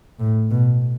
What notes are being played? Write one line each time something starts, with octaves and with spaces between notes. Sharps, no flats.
A2
B2